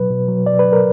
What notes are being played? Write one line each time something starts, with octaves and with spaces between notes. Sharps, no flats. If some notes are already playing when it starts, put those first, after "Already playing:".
Already playing: B2 F#3 B4
B2
F#3
B2 D5
B4
F#3
A#4